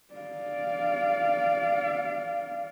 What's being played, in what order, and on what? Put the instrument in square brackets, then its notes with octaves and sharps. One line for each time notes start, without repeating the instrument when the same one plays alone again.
[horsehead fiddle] D5 F5